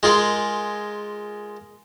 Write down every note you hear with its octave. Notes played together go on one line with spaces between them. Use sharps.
G#3 F4 G#4 A#4